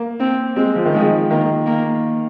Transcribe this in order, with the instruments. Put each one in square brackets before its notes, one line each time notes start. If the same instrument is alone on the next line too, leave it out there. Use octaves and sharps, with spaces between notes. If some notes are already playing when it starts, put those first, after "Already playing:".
Already playing: [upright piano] A#3
[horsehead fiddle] C4
[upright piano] G#3 [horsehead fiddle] C4
[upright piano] F3
D#3
[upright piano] F3 [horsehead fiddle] G#3
[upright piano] D#3 [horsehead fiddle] A#3
[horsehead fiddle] A#3